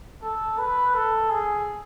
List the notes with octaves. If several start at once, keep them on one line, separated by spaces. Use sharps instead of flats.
A4
B4
A4
G#4